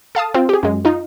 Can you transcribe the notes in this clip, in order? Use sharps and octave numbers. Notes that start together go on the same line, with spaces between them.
A4 F5 A5 D#6
C4 F4
G4 G#4
F#2 G#3
D#4 F4